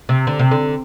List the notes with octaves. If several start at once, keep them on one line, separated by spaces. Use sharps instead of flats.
C3
D3
C3
D3